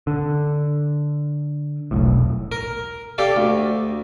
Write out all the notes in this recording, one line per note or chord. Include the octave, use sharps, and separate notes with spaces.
D3
E1 B1 A2
A#4
G4 A4 D5 F5
D2